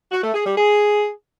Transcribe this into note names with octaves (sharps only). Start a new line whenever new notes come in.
F#4
A3
G#4
G3
G#4